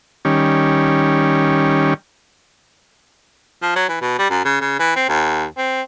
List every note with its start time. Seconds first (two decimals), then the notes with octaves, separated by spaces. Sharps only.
0.25 D#3 G3 C#4
3.62 F3
3.76 F#3
3.89 E3
4.01 B2
4.18 G3
4.30 F#2
4.45 C#3
4.61 C#3
4.79 E3
4.96 C4
5.09 D#2
5.57 C4